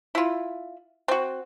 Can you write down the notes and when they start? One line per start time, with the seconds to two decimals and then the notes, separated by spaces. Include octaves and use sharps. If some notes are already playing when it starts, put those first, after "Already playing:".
0.15 E4 F4
1.08 C4 F#4